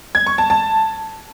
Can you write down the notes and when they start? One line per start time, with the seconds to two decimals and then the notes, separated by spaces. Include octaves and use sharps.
0.15 G#6
0.26 C#6
0.38 A5
0.50 A5